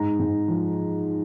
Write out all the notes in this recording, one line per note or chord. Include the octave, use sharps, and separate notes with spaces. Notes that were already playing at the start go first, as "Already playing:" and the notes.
Already playing: G#2 A#5
G#2
F3